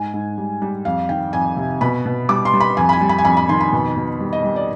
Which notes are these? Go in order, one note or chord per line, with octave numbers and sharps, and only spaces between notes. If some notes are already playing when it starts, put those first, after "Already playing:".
Already playing: G#2 G#5
G#2
G3
G3
F2 F5
D#3 G5
F2 G#5
C3
B2 B5
B2
G3 D6
C6
G3
B5
F2 G#5
B5
G#5
G3
B5
G#5
F2 B5
B5
D#3 C6
B5
B2
B2
G3
D#5
G3
D5